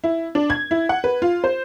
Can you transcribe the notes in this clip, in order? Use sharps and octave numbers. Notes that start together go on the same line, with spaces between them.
E4
D4
G#6
E4
F#5
B4
F4
C5